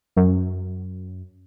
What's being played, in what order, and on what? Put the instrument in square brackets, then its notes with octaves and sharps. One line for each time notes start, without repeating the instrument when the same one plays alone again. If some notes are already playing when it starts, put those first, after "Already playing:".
[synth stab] F#2